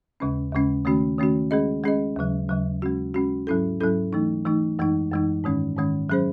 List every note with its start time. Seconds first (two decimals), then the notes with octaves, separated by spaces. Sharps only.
0.20 D#2 C#3 G#3 C#4
0.52 D#2 C#3 G#3 C#4
0.85 D#3 A3 C#4 F#4
1.18 D#3 A3 C#4 F#4
1.51 G#3 C#4 G#4 D#5
1.84 G#3 C#4 G#4 D#5
2.16 D#2 C#3 F#3
2.49 D#2 C#3 F#3
2.82 G#3 C#4 F#4
3.14 G#3 C#4 F#4
3.47 G#2 F#3 C#4 E4 A4
3.81 G#2 F#3 C#4 E4 A4
4.13 E3 A3 D#4
4.45 E3 A3 D#4
4.79 F#2 E3 G#3 D#4
5.11 F#2 E3 G#3 D#4
5.44 G#2 D#3 G#3 C#4
5.77 G#2 D#3 G#3 C#4
6.10 F#3 C#4 G#4 C5